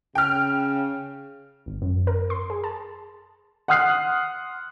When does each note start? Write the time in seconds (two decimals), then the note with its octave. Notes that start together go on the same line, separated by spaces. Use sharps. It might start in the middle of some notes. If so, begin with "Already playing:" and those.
0.15 C#3 G5 F6
1.66 G#1
1.82 F#2
2.07 A#4
2.30 C6
2.50 G#4
2.64 A5
3.68 F#5 C6 D#6 F6 F#6 C7